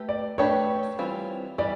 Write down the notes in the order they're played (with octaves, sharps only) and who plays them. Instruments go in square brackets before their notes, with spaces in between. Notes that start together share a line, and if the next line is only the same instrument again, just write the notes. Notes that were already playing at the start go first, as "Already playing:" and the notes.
Already playing: [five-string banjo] A3 G4 B4
[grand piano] D5
[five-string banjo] A3 D4 G4 B4 [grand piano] C#5
[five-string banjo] E3 G3 C4 F4
[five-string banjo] E3 G3 [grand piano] D5